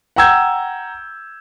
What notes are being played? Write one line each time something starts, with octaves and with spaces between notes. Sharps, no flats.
F#5 G5 A#5 E6 G6 G#6